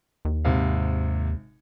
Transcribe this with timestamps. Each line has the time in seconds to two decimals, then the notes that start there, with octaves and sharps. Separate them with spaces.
0.25 D#2
0.45 G#1 C3 F5